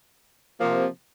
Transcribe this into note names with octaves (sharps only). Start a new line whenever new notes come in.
C3 F3 A#3